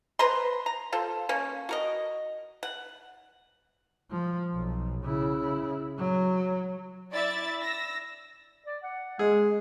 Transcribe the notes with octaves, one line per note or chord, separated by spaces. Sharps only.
B4 C5 A#5 C6
A#5
F4 A4 C5
A#3 C#4
F#4 A#4 D#5
F#5
F3
B1
C#3 E4
F#3
E4 D5 E5 A6
E6 A#6
D5
F#5
G#3 G#4